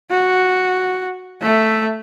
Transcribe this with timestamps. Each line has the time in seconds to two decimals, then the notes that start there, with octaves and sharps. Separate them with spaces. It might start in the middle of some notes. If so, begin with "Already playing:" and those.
0.10 F#4
1.42 A3 E5